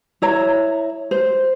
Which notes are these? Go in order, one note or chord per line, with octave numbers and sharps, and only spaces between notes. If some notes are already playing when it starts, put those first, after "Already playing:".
E4 C#5 A#5
C5